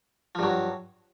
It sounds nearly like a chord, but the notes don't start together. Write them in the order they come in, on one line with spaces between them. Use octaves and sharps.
F3 G2 F#3